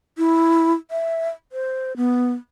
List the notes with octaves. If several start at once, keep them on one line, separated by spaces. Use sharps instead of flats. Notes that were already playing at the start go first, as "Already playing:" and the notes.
E4
E5
C5
B3